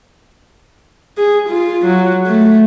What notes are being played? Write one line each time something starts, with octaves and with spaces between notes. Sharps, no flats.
G#4
F4
F#3
A3